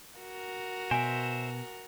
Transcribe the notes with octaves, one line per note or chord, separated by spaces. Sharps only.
F#4 A#4
B2 C5 E5 G#5